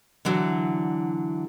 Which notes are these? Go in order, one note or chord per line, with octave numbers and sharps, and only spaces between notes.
D3 E3 F#3